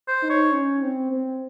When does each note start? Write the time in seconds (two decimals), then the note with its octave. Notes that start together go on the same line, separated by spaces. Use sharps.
0.08 C5
0.23 D#4
0.30 C#5
0.52 C#4
0.82 C4
1.12 C4